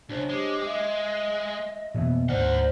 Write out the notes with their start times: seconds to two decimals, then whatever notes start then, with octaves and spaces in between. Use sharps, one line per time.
0.09 C#2 D4 C5 C#5
0.29 G#3 G4
0.67 D#5 E5
1.94 F2 B2 E3 A#3 B3 E5
2.29 D2 G#2 A#4 C5 D5 F#5 F6